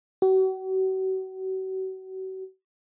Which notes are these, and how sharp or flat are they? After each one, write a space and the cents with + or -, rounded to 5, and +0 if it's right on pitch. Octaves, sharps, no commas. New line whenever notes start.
F#4 +40